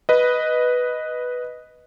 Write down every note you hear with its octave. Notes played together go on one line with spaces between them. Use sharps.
B4 D#5